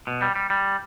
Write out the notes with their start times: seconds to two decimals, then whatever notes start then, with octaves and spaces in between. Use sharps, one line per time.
0.07 B2
0.22 G3
0.36 G3
0.50 G3